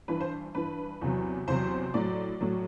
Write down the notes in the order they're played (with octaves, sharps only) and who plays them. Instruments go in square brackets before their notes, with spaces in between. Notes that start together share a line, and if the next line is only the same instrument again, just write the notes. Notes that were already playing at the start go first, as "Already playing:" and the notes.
[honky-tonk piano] G2 E3 B4
C5
G2 E3 B4
E2 C3 F#3
E2 C3 F#3 C5
A2 F#3 D5
A2 F#3